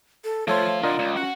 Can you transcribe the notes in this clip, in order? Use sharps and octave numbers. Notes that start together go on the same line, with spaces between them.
A4
F3 A3 F4 A4 C5 C#5
D3 F4 A#4 D5 D#5
C#2
C#4 F#4 F#5